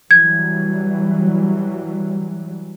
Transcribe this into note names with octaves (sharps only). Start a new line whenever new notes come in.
E3 F#3 G3 G#6